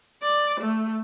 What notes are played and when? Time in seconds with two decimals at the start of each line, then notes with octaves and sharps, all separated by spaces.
0.23 D5
0.60 A3